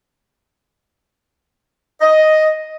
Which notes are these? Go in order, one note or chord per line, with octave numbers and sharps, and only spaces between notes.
D#5